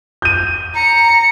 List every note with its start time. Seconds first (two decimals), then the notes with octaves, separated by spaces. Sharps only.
0.22 G6 D#7
0.74 A#5 C#7